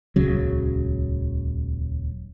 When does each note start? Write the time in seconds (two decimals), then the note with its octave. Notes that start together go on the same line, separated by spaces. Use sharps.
0.16 D#1 C#2 C#3 F#3